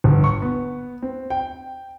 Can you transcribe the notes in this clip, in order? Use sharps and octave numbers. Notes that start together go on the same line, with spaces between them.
G1
C#6
B3
C4
G5